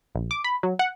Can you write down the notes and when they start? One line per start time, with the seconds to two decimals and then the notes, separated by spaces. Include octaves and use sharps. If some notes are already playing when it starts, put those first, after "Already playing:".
0.15 A#1
0.31 D6
0.44 B5
0.63 F#3
0.79 F#5